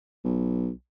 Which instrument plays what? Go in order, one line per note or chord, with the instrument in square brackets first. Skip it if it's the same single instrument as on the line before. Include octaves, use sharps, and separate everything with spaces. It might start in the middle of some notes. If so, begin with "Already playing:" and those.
[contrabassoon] B1